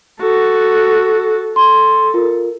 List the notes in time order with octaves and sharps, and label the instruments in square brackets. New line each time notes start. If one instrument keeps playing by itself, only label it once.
[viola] F#4 A4
[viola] A4 [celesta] C6
[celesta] F4 A#4